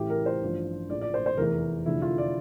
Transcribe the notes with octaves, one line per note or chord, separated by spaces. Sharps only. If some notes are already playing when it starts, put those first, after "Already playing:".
Already playing: A1 A2 E3 G4
A#4
C5
A1 G2 F3
A#1 A2 F3 D5
D5
C5
C5
F1 E2 E3 A#4
F1 E2 D3 F3 E4
F4
D5